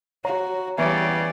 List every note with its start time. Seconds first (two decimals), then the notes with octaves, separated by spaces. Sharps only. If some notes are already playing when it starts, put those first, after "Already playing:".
0.25 F#4 C#5 A#5
0.78 C#3 E3 G3 B3 D5 E5